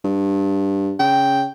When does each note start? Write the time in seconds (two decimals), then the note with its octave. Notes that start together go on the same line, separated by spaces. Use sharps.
0.05 G2
0.99 C#3 G5